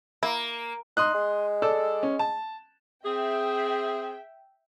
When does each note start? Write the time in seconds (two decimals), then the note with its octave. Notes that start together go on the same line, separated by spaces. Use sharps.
0.23 A#3 E4
0.97 D#4 C6 D#6 F#6
1.14 G#3
1.62 A4 D5 E6
2.03 C#4
2.19 A5
3.05 C4 G#4 E5 G5